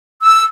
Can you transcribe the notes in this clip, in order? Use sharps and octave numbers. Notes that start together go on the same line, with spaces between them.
E6